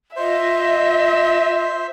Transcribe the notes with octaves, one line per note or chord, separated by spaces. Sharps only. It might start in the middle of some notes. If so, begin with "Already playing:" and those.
F4 C5 D#5 E5